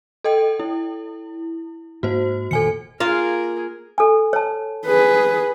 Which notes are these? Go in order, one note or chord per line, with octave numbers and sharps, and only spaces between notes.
A4 D#5 G5
E4
G#2 A#3 F#4 C5
F1 A#2 D#3 A4 G#5 C#7
A#3 F4 G#4 A#4 F5
A4 G#5
C#5 A5
G#4 B4